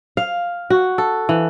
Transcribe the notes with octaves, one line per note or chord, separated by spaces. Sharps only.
F5
F#4
A4
E3